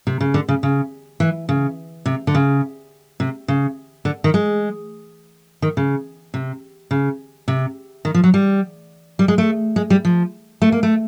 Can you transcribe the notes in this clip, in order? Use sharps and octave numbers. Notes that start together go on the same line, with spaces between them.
C3
C#3
D3
C#3
C#3
E3
C#3
C3
D3
C#3
C3
C#3
D3
D#3
G#3
D#3
C#3
C3
C#3
C3
D#3
F3
F#3
G3
G3
G#3
A3
G#3
G3
F3
A3
A#3
A3